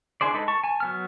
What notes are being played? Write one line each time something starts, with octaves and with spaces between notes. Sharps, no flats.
D4 E4 G#4 C5 D5
G#3 D#4 A4 B4
A5 C#6
G#5 A5
F#3 B3 F6